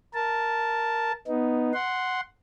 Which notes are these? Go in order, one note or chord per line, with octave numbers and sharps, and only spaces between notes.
A#4 A5
B3 D#4
F#5 C6